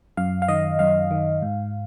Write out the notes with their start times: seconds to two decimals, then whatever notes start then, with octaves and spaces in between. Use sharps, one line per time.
0.17 F#2 F5
0.42 F5
0.48 D#3 D#5
0.79 F#2 F5
1.11 D#3
1.42 G#2